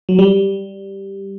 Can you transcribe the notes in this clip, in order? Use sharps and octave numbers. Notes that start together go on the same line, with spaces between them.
F#3
G3